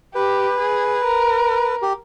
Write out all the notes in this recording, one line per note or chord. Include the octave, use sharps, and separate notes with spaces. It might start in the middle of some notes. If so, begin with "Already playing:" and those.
G4 B4
G#4
A#4
G4